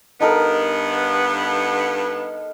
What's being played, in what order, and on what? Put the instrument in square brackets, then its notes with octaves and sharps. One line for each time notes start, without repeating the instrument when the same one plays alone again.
[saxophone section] G2 B3 [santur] D#4 A4 A#4